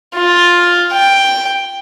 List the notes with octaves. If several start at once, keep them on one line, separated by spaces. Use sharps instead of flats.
F4
G5